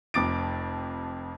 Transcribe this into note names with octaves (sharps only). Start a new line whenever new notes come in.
F1 F2 D6 A6 D7